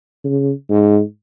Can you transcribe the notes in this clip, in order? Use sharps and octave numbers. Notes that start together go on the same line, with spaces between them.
C#3
G#2